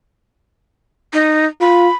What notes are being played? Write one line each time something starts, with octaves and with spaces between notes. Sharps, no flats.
D#4
F4 B5